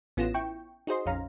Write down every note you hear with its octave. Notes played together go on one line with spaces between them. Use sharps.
A1 B3 C#4 F4 A#6 E7
E4 G5 C#6
D#4 F#4 G#4 C5 D#5 C6
A#1 F2 C#4 F5 A#5